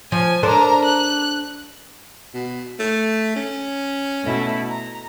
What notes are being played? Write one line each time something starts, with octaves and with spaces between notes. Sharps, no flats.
F3 G#5
D4 A4 A#4 C5 A#5
F#6
B2
A3
C#4
B2 A3 E4
A#5